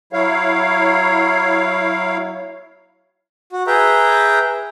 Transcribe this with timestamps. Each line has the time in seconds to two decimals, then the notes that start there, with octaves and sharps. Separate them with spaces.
0.13 F#3 E4 C#5 F5
3.52 F#4
3.67 G#4 B4 E5 G5 A#5